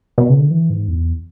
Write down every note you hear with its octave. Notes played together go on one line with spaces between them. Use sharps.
B2
C#3
D3
E3
G#2
E2